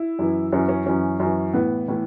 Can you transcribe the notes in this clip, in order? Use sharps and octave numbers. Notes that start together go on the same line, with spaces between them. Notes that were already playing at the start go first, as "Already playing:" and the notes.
Already playing: E4
F#2 E3
F#2 E3 C#4
C#4
F#2 E3 C#4
F#2
E3
A2 E3 B3
A2 E3